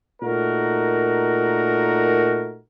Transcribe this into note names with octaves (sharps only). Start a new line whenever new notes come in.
A#2 A3 D#4 F#4 A#4